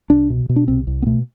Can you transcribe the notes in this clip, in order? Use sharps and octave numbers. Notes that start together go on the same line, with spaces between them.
C2 D4
B2
B2
D4
C2 C4
C2
B3
B2 A3